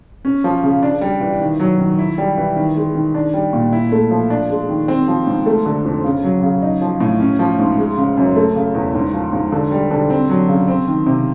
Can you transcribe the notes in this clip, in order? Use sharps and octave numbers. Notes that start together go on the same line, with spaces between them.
C#4
F3
C#3
D4
G3
E3
D#3
F#3
D#3
E4
G3
E3
D#3
G#3
D#3
D4
G3
A#2
E4
A3
F3
D4
G#3
D#3
C4
F3
G#2
A3
D3
F2
C#3
F#3
C#3
D#4
F3
A2
C#4
F3
G#2
G#3
C#3
F#2
A3
C#3
E2
G#2
F3
G#2
D3
G3
D3
C4
F#3
C#3
C4
D#3
C3